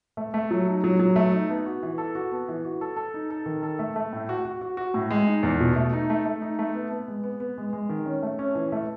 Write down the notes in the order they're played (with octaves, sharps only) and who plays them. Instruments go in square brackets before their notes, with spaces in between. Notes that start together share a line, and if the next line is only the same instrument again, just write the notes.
[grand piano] A3
A3
F#3
D#4
F#3
F#3
A3
D#4
B3
F#4
E3
A4
F#4
B3
E3
F#4
A4
A4
D#4
A4
D#3
A4
A3
A3
A2
F#4
F#4
F#4
F#4
A2
G#3
D#4
E2
B2
A3
D#4
A3
A3
D#4
A3
B3
B3
G#3
B3
B3
G#3
G#3
D#3
C#4
A3
C#4
E3
A3